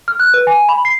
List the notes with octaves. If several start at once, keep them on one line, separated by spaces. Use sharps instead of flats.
F6
F#6
B4
G#5
B5
C7